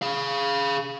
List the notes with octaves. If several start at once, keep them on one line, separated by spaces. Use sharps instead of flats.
G#4 F5